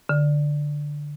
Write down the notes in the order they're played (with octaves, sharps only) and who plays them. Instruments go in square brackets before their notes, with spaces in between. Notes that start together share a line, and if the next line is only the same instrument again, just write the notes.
[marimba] D3